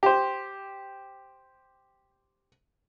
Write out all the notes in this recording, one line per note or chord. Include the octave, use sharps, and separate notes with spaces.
G4 C5